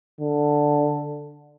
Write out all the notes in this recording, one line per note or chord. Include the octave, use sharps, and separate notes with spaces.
D3